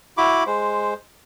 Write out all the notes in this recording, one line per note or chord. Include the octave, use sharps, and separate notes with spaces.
E4 F#4 B5 D6
G#3 C5